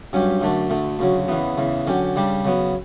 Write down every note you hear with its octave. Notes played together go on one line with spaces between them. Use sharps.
G2 F#3 C#4 G4
F#2 D3 A3 D4
D2 D3 A3
D2 C#3 F#3
E2 C#3 E3 B3
E2 C#3 E3
D3 F#3 C#4 G4
C#3 G3 D4 G4
C#3 F#3 B3